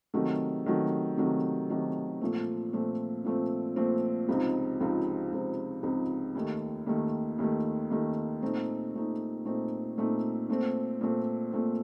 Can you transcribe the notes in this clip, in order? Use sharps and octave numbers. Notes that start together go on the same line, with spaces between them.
C3 D#3 F#3 A3
C3 D#3 F#3 A3
C3 D#3 F#3 A3
C3 D#3 F#3 A3
A#2 F3 A3 C4
A#2 F3 A3 C4
A#2 F3 A3 C4
A#2 F3 A3 C4
C#2 C3 F3 C4 D#4
C#2 C3 F3 C4 D#4
C#2 C3 F3 C4 D#4
C#2 C3 F3 C4 D#4
D#2 D#3 A3
D#2 D#3 A3
D#2 D#3 A3
D#2 D#3 A3
A#2 A3 C4 D#4
A#2 A3 C4 D#4
A#2 A3 C4 D#4
A#2 A3 C4 D#4
A#2 A3 C4
A#2 A3 C4
A#2 A3 C4